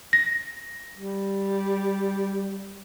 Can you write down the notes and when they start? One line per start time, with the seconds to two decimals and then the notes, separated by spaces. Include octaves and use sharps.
0.13 A#6
0.95 G3